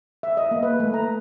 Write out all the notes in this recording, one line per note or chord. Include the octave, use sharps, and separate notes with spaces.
E5
D#5
A#3
B4
A3
A#5